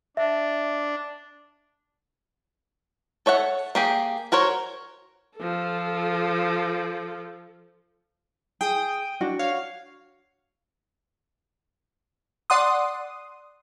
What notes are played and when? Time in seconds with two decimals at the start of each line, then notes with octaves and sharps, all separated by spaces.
0.17 D4 E5
3.26 A4 C#5 E5 F#5
3.75 A#3 G4 G#4
4.32 F#4 A#4 C5 C#5
5.37 F3 A4
8.61 G#4 G5 D#6
9.21 D4 F#4
9.39 C#5 F5
12.50 D5 F#5 C6 D#6